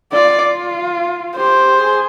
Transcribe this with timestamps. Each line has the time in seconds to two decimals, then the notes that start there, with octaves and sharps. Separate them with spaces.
0.13 F4 D5
1.37 G4 C5
1.78 G#4